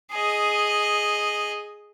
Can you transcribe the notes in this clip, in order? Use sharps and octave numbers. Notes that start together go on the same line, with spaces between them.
G#4 D#5